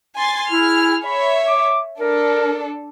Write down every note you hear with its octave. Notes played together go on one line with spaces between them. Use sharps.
G#5 C6 A6
E4 G#4 F6
C#5 E5 B5
D6
D4 A4 A#4